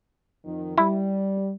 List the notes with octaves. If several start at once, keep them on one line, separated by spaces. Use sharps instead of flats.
F2 D#3
G3 E4